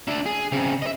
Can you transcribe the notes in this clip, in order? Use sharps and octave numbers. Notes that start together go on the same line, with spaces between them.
D4 E5
G#4
C#3 C4
D#5 E5